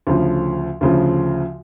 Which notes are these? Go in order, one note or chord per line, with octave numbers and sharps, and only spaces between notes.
D2 C#3 F3
D2 C#3 F3